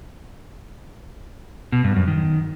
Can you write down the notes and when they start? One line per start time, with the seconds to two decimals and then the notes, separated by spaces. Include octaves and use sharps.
1.72 B2
1.84 G2
1.96 F#2
2.08 D#3